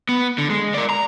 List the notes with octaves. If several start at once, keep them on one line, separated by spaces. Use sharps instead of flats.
B3
D3
G#3
A#4 D5
A#5